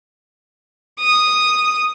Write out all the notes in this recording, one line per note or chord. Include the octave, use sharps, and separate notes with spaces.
D#6